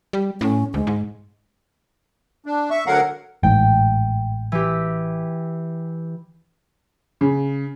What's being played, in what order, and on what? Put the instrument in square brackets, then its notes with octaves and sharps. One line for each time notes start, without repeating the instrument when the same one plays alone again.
[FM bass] G3
[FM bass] A2 [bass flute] C#4
[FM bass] D2 [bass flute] G#3
[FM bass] G#2
[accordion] D4
E5 C#6
D2 D3 F#3 A#4 F5 F#5
[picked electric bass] A1 G#2 [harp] G5
[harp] E3 G4
[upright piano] C#3